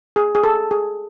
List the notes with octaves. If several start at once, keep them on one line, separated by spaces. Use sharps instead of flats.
G#4
G#4
A4
G#4